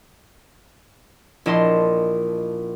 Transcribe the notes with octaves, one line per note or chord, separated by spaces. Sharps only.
A#1 E4 D#5 A5 C6